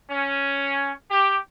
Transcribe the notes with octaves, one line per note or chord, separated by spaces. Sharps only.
C#4
G4